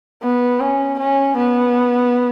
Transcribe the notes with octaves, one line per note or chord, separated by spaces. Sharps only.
B3
C#4
C#4
B3